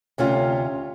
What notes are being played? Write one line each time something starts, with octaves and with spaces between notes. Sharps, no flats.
D2 C3 C#4 F4